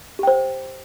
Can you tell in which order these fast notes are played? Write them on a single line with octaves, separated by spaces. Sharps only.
G4 G5 C5